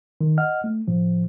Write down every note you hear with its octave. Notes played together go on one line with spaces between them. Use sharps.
D#3
D#5 F#5 F6
A3
A2 F3